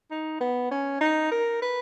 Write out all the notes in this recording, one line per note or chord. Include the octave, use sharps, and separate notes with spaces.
D#4
B3
C#4
D#4
A#4
B4